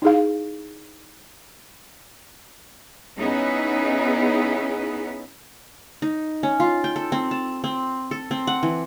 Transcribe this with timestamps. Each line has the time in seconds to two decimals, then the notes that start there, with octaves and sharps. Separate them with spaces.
0.02 D#4 E4 G#4 F5
3.19 B3 C#4 D#4 E4 G#4 B4
6.02 D#4
6.43 C#4
6.60 F4
6.84 G5
6.96 A4
7.12 C4
7.31 A5
7.64 C4
8.11 A4
8.31 C4
8.47 F#5
8.63 E3